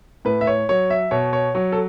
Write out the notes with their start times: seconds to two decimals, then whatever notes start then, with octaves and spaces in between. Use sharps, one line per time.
0.25 A2 B4
0.41 E5
0.47 C#5
0.69 F#3 C#5
0.90 E5
1.11 B2 C#5
1.33 C#5
1.55 F#3 C#5
1.72 A4